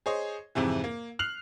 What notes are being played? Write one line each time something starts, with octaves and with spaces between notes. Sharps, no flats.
G#4 C5 C#5 D#5
F2 G#2 C3 E3
A#3
F6 F#6 C7 F7 F#7